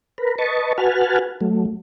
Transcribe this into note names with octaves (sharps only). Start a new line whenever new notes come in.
A#4 B4
B4 D#5 A5 C#6
F#4 B4 F#5 G#5 A5 F6
F#3 A3